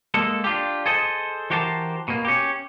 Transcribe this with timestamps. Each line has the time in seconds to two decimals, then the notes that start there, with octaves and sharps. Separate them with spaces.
0.14 G#3 A#3 A4
0.44 D4 F4 G4
0.86 G#4 A4 C5 D#5
1.50 E3 F#4 G4 A#4 C5 A5
2.08 B2 A#3
2.25 C#4 G4